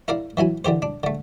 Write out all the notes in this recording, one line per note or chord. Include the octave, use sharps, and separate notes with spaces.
E4 A#4 D5 F5
E3 F#3 E4 G#5
D3 E3 G4 C5
D4
D3 A3